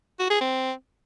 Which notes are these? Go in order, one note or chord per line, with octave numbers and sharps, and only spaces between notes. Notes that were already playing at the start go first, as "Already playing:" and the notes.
F#4
G#4
C4